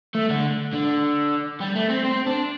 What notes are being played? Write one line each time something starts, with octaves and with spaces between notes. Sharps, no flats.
A3
D3
D3
G3
A3
C4
C4
D4